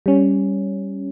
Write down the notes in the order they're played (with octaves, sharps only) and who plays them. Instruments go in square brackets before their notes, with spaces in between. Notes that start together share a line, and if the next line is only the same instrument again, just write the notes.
[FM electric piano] G3 C#4